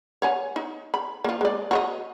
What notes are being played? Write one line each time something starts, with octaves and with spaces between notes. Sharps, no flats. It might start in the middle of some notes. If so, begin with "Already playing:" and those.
C#5 F#5 G#5
D#4
B5
F3 A#3
G#3 D5
F#4 C#5 D#5